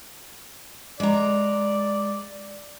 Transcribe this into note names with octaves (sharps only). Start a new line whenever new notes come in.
G#3 D5 A#5